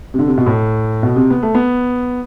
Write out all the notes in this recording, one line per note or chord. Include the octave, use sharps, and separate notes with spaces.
C3
D3
C3
B2
A2
B2
C3
B3
A3
B3